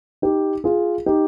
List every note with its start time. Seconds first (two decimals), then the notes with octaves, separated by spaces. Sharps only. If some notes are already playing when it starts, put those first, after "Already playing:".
0.22 D#4 G4
0.64 F4 G#4
1.06 D#4 G4